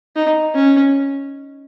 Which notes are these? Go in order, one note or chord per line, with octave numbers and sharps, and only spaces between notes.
D#4
C#4